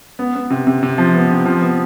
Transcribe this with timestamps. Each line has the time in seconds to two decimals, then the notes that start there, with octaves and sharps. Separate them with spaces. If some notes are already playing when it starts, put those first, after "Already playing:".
0.19 B3
0.35 B3
0.50 C3
0.67 C3
0.83 C3
0.98 F3
1.14 B3
1.31 C3
1.45 F3
1.61 B3